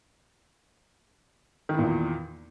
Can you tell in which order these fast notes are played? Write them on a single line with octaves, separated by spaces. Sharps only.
D#3 E3 A#2 E2